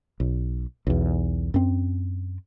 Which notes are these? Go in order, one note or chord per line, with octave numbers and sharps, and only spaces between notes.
B1
B1 E2
F#2 C4